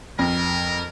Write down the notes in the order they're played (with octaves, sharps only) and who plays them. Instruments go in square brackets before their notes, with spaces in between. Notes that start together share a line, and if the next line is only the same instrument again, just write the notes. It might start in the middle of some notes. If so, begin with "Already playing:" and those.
[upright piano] F2 [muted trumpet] A#4